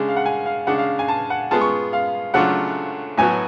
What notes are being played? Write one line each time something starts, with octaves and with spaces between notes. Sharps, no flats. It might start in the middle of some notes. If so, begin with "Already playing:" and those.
Already playing: C#3 G#3 D4
F5
F#5
G#5
F5
C#3 G#3 D4 F#5
F5
G#5
A5
F#5
G#3 B3 F4 G#4 A5
C#6
F5
C#3 F#3 A3 D4 F4 F#5
A2 F#3 B3 F#4 G#5